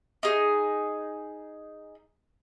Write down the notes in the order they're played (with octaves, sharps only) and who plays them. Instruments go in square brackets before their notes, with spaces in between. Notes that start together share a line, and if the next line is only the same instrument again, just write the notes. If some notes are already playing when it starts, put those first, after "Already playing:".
[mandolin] D#4 G#4